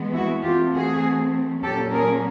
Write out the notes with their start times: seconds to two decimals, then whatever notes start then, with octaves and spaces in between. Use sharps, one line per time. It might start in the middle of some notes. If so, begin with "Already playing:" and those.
Already playing: E3 G#3 B3
0.14 E4 F#4
0.43 E3 A3 C4 F4 G4
0.73 F#4 G#4
1.63 A#2 F#3 A#3 C#4 G4 A4
1.93 G#4 A#4